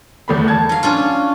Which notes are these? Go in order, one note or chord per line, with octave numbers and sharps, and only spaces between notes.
E2 A3 B5
A5 G#6
F#3 F5
C#4 D4 F4